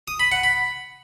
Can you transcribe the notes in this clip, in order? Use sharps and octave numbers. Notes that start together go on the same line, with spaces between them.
D#6
B5
F#5
B5